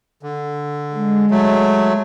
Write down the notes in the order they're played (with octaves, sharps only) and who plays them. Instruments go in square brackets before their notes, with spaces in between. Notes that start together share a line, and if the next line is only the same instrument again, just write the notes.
[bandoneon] D3
[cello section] G#3
[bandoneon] F#3 A3